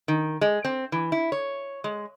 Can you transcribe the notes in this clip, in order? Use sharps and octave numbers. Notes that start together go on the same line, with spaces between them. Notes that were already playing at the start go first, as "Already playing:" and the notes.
D#3
G#3
C4
E3
E4
C#5
G#3